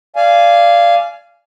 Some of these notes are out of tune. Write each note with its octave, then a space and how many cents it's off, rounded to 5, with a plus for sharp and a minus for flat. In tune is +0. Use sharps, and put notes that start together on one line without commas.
D5 +0 F5 -15 G#5 +10